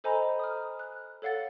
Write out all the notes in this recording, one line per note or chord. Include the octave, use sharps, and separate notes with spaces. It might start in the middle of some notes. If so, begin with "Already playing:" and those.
A4 C5 D#5 G#5 A#5 B5
D#6 F6
F#6
A4 C#5 F5 F#5 A6